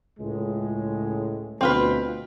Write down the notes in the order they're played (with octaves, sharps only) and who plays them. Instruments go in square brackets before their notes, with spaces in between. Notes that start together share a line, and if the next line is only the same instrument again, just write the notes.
[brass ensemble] C#2 A2 G#3
[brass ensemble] D2 B2 [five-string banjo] C4 F4 B4